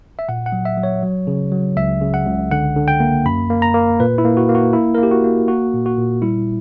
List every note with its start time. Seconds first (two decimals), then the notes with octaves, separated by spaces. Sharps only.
0.19 E5
0.29 A#2 F#5
0.46 F#5
0.52 F#3
0.65 E5
0.77 F#3
0.83 C#5
1.03 F#3
1.27 C#3
1.52 F#3
1.77 C#2 E5
2.01 C#3
2.14 F#5
2.26 C#2
2.51 D3 F#5
2.76 D3
2.88 G5
3.00 A#3
3.26 F#2 B5
3.50 A#3
3.62 A#5
3.74 A#3
4.00 A#2 B4
4.18 E4
4.25 A#3
4.37 F#4
4.49 A#3
4.55 F#4
4.73 A#3 E4
4.95 A#4
4.98 A#3
5.03 G4
5.11 F#4
5.24 A#3
5.47 A#3 F#4
5.73 A#2
5.86 F#4
5.98 A#2
6.22 G3 E4